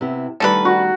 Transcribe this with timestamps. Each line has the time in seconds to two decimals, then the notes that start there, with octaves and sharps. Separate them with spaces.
0.01 C3 B3 E4
0.40 D3 D#3 G3 A3 A4 B4
0.65 F#4